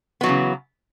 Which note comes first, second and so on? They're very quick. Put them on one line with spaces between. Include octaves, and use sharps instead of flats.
B3 F#3 E3 C#3